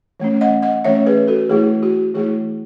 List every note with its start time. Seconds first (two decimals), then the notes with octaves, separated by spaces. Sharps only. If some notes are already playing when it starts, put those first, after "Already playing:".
0.20 E3 A3 C#4
0.41 D#5 F#5
0.62 D#5 F#5
0.85 E3 A3 C#4 C#5 E5
1.06 G#4 B4
1.28 F#4 A4
1.49 E3 A3 E4 G#4
1.83 F#4
2.14 E3 A3 E4 G#4